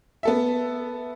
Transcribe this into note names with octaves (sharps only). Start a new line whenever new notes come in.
B3 A4 E5